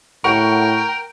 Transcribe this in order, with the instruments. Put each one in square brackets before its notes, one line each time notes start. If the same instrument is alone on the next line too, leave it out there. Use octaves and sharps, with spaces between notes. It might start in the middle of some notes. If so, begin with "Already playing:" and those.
[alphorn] A2 [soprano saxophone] A#4 [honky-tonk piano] F#5 C#6 [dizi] G5